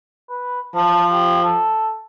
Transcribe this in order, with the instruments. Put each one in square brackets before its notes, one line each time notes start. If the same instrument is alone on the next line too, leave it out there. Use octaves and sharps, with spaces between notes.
[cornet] B4
[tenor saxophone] F3 [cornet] A5
[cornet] G4
A4